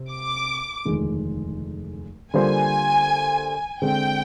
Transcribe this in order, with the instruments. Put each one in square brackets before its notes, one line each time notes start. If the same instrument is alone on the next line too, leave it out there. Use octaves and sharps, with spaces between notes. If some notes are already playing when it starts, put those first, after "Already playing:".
Already playing: [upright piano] C3 C4
[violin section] D6
[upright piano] F1 D#2 D3 G#3
[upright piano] D3 G3 A#3 F4 C5 [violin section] G#5
[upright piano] D3 G#3 C4 [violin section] G5